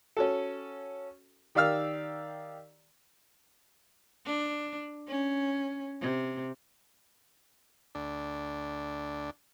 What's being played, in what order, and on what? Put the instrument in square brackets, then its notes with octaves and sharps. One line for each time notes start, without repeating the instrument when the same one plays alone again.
[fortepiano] C#4 F#4 A4
D#3 G4 D5 F5 E6 F6
[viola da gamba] D4
C#4
C3
[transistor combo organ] D2 D4